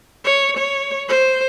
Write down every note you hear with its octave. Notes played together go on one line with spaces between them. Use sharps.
C#5
C#5
C5